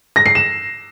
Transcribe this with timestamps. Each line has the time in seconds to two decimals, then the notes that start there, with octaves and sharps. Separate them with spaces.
0.16 A#6
0.26 C7
0.35 E7